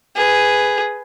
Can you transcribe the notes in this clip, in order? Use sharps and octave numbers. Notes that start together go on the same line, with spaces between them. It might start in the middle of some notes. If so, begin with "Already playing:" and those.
G#4 B4